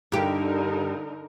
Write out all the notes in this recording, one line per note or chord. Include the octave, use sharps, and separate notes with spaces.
G2 D3 D#4 G4 A#4